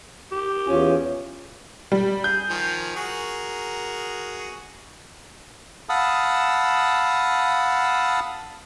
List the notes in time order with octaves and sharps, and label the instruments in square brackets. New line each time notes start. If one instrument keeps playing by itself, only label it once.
[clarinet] G4
[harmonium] E2 C#4 G#5 [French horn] F4
[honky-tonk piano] G3
[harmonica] G#4 [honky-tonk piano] G6
[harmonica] D#3 F3 G#5
F#4 G#4 A#4
[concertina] F5 F#5 A5 B5 D#6 E6